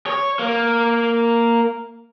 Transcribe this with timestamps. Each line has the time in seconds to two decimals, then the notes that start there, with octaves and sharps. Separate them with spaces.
0.06 C#5
0.39 A#3